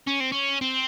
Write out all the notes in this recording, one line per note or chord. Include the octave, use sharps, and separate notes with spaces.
C#4
C4
C#4
C4